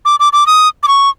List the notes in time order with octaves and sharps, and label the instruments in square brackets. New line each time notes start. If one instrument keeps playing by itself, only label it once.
[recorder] D6
D6
D6
D#6
D6
C#6